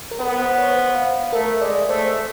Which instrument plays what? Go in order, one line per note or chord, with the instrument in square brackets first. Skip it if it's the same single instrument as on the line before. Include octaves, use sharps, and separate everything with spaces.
[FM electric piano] A#4
[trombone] B3 [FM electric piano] B4
[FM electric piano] C5
C#5
C5
F5
[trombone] A3 [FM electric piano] A#4
[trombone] G#3 [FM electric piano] D5
[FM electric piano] D#5
[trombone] A3 [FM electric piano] C5